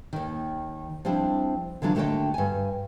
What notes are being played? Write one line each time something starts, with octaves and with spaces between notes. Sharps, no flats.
D#2 D#3
F3 G3 C4 D4 E4
D3 E3 F#3 D4 F4
D#2 D3 A3 F#4 D#5 G5
G2 G#5